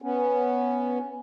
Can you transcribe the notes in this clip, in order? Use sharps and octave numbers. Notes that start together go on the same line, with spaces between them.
B3 C#4